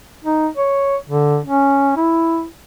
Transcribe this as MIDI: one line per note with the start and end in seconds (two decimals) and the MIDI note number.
0.24 0.48 63
0.57 0.96 73
1.09 1.39 50
1.45 1.92 61
1.96 2.45 64